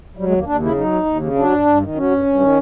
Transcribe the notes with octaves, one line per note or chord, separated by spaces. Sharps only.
F#3 G3
G#3
D#2
A#3
D#2 D4
C#3 E4
F#3 D#4
D#2
D#2
C#3
F#3 D4
G2
G2
D#3
F#3 C#4
G2
G2
D#3